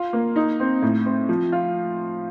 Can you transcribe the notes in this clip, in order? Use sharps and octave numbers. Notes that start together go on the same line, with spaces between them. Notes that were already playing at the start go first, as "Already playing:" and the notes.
Already playing: F4
A#3
D#4
C4
A2
C4
F3
F4